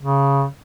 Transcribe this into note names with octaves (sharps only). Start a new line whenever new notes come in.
C#3